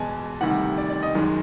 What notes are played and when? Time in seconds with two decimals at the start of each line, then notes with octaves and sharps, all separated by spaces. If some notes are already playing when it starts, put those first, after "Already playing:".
Already playing: E2 B2 G#3 G#5 A5
0.41 D2 C3 D#3 G3 F#5
0.78 D5
0.90 D5
1.03 D#5
1.14 F#2 D#3 G#3